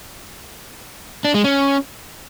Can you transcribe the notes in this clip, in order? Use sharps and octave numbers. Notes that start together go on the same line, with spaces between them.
D4
G#3
C#4